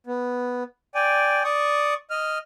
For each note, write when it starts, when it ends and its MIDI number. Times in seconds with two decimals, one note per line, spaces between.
0.07 0.64 59
0.95 1.43 74
0.95 1.43 79
0.95 1.43 80
1.44 1.94 74
1.44 1.94 85
1.44 1.94 87
2.10 2.38 75
2.10 2.38 89